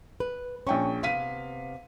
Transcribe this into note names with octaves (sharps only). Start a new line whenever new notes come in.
B4
A#1 C#4 G5 C#6
C3 B3 F5 B6 D#7